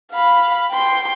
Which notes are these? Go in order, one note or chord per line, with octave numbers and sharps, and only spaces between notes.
F5 B5
G5 C6